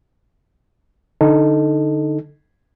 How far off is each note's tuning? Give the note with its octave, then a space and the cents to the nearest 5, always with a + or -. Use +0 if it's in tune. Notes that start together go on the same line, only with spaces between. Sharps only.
D3 +0 D#4 +0 A4 +0